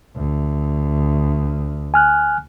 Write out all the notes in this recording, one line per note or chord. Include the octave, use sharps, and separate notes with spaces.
D2
G#5 F6 F#6